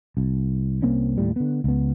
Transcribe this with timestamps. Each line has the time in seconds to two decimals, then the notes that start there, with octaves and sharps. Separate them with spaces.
0.17 C2
0.82 C2 A#3 C4 C#4
1.17 D#2 A2 G3
1.36 D3 B3
1.64 C#2 B3